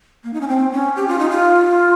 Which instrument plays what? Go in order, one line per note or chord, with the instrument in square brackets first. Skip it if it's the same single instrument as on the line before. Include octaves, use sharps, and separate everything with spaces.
[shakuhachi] A#3
D#4
C#4
C4
C#4
G4
F4
D#4
F4